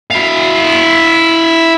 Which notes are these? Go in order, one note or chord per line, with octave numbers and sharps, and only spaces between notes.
E4 F5